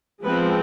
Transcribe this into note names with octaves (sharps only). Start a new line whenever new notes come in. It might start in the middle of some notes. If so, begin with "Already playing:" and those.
F3 G#3 B3 C4 B4